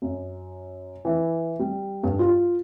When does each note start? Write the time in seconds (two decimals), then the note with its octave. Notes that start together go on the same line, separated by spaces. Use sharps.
0.02 F#2
1.05 E3
1.59 G3
2.03 G2
2.19 F4